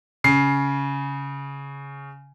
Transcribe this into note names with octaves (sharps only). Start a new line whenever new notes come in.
C#3 C7